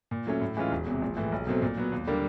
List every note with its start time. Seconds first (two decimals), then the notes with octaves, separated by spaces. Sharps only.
0.11 A#2
0.27 F#3 A3 C#4
0.41 A2
0.57 E3 G#3 C#4 F4
0.72 E1
0.86 E2
0.91 C3
1.02 A#1
1.17 A2 E3
1.32 B1
1.47 B2 F#3 A3 C4
1.62 A#2
1.77 F#3 B3
1.92 D#2
2.07 D3 G3 A#3